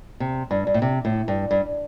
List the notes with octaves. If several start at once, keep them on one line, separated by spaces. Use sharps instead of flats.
C3
G2
G2
A2
C3
A2
G2
G2